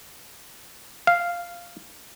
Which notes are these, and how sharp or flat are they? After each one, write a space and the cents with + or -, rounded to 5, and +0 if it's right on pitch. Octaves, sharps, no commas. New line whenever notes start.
F5 -5